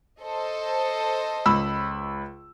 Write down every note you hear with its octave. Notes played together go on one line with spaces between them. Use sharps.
A4 C5 D#5
C#2 B5 E6